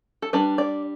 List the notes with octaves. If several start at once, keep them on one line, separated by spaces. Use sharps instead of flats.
A4
G3 D4 B4
D5